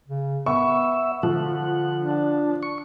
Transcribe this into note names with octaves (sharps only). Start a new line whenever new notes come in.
C#3
B3 E5 C#6
D3 F3 F#5
D4
C#6